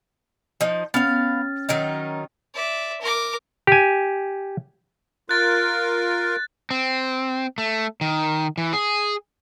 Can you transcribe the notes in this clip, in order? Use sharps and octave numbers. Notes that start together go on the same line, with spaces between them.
F3 D#4
B3 C#4 F5 F6 A6
D#3 F#3 D#4
D5 E5
A#4 D6
G4 G#5
F4 A#4 F#6 A6
C4
A3
D#3
E3
G#4